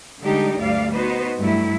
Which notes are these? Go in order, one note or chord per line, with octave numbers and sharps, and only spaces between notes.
D3 G3 G#3 D4 D#4 G4
D2 G2 F#3 G3 D5 F5
B3 D#4 F#4 B4 C5
G2 F#3 A3 E4